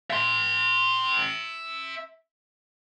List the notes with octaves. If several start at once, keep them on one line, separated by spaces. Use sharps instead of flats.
E5 C6